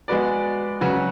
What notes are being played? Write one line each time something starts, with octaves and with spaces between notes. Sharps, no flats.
G#3 B3 F#4 B4 D5
C#3 F#3 C#4 F#4 B4